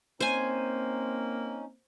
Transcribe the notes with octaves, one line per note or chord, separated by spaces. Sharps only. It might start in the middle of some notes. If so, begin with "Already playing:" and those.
A#3 C4 C#4 D#4 C5 G#5